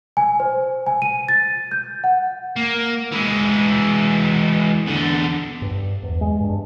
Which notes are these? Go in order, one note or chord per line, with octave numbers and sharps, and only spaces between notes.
G#5
C5
G#5
D#7
A6
G6
F#5
A#3
E3 G#3
E2 D3
G2
E2
G#3
G2 D4